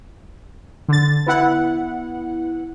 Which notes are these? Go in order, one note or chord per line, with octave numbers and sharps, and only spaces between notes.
D3 A6
B3 E4 F#5